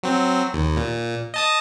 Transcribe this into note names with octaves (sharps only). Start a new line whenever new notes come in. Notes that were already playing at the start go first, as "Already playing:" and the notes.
F#3 C4
D#2
A#2
D#5 A5 D#6